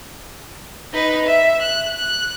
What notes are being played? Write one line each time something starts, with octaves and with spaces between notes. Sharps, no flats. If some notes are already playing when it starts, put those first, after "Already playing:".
D#4 B4
E5
F#6
F#6